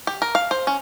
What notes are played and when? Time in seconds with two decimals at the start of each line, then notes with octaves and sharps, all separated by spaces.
0.07 G4
0.22 A#4
0.35 F5
0.51 C5
0.67 C#4